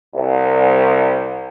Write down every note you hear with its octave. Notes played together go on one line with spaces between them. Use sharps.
C2